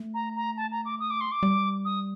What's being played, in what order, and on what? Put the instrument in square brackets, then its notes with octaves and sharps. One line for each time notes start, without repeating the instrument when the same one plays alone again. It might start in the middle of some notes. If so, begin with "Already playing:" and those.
Already playing: [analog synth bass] A3
[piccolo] A#5
A#5
A5
A#5
D6
D#6
D6
C6
D6
[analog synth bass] G3
[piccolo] D#6